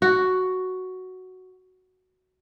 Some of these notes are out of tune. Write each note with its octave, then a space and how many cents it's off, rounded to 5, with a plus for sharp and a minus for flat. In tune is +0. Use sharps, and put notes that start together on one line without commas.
F#4 +5